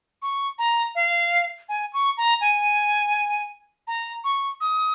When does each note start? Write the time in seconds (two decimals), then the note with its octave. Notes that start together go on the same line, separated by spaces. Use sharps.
0.22 C#6
0.59 A#5
0.95 F5
1.69 G#5
1.93 C#6
2.17 A#5
2.41 G#5
3.87 A#5
4.24 C#6
4.61 D#6